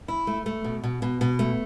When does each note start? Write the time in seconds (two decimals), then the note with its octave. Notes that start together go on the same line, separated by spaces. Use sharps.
0.08 E4
0.27 A3
0.46 A3
0.64 B2
0.84 B2
1.02 B2
1.21 B2
1.39 A3